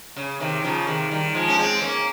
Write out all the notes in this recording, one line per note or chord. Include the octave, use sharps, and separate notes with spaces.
C#3
C3 D#3
C#3 F3
C3 D#3
D#3 G3
F3 G#3
C#4
G#3 C4
A#3 C#4